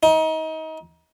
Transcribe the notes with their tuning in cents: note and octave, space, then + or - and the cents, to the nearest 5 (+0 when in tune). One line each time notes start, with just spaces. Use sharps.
D#4 +30